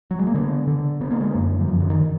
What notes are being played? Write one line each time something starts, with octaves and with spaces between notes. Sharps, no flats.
F#3
G#3
A#3
D3 B3
D3
D3 B3
A#3
G#3
F#2 A#3
F#3
F#2 F3
D3
D#3